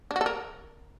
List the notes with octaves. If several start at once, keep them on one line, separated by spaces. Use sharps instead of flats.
D4
F#4
A4
A#4